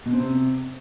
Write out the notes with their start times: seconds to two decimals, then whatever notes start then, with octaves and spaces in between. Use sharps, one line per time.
0.06 B2
0.12 C4
0.19 C3